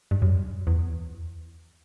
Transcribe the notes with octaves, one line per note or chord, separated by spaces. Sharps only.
G2
F#2
E2